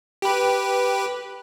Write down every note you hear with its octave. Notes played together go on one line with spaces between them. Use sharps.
G4 B4